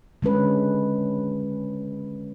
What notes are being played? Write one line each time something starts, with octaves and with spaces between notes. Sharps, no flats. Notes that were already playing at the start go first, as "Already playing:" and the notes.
D3 G#3 C#4 B4